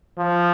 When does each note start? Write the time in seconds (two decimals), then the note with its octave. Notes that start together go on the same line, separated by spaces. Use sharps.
0.18 F3